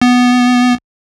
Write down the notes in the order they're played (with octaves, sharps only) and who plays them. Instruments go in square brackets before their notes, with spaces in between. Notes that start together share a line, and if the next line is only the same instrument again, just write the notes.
[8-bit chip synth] B3